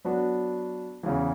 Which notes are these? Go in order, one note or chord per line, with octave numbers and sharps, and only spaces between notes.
F#3 B3 D4 F#4 B4
E2 C#3 E3